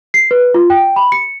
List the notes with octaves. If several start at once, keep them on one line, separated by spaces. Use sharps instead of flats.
C7
B4
F4
G5
B5
C#7